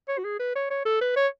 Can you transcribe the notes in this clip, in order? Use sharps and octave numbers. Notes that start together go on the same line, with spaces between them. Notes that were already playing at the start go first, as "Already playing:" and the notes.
C#5
F#4
G#4
B4
C#5
C#5
A4
B4
C#5